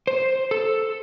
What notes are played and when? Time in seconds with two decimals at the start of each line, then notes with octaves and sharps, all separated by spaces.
0.07 C5
0.51 A4